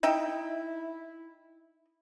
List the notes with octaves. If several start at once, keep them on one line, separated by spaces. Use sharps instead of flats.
D#4 E4 E5 G5